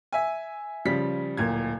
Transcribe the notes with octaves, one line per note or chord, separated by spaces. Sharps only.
E5 G#5
C#3 F3 G3 B6
D1 A#2 G#6